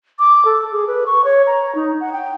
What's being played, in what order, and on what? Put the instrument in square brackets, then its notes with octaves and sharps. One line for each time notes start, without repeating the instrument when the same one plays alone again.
[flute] D6
A4
G#4
B4
C#6
C#5
A#5
D#4
F#5
G5